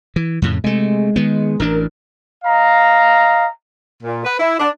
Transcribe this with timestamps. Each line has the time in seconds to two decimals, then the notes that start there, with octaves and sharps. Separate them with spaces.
0.16 E3
0.42 F2 A2 C#3
0.64 C3 G#3 A3
1.16 D#3 B3
1.60 A1 E3 D4 A#4
2.44 D#5 F5 A#5
4.03 A#2
4.25 B4
4.39 E4
4.59 D4